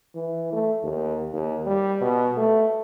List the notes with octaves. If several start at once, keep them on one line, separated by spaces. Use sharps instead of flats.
E3
A3
D#2
D#2
G3
B2
A3